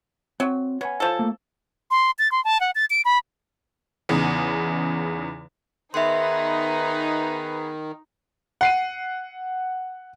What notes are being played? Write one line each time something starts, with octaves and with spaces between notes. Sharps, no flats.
F#3 C4
B3 C#5 G#5
F3 A4
A3 A#3
C6
A6
C6
A5
F#5
A6
D7
B5
E2 C#3 B3 D#4
D#3 B3 D#4 G#4 B4 E5 C6
F#5 C7 D#7